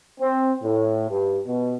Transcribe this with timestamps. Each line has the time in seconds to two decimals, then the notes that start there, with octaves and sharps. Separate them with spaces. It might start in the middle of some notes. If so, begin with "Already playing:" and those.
0.21 C4
0.63 A2
1.10 G2
1.46 B2